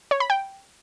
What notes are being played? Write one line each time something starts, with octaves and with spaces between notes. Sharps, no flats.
C#5
B5
G5